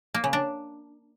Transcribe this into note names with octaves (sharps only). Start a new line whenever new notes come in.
A#3
C#3
D4